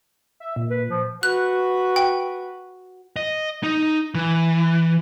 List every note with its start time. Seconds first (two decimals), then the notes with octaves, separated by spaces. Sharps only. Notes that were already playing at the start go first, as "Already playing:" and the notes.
0.40 E5
0.56 A#2
0.70 B4
0.89 F3
1.23 F#4 B4 F#6
1.96 G5
3.16 D#5
3.63 D#4
4.15 E3